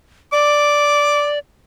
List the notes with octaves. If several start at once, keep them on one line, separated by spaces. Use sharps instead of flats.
D5 D6